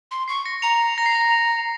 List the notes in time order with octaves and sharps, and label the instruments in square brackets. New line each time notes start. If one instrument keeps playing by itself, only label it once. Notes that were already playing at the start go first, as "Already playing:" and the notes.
[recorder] C6
[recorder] C#6 [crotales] C7
[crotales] A#6 C#7
[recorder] A#5 [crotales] C#7 F7
[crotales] A#6
C7
A#6